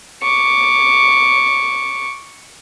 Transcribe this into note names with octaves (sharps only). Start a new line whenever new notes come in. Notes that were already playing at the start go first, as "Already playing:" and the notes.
C#6 D6